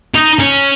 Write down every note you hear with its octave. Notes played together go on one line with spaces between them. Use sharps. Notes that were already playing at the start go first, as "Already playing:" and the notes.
D#4
C#4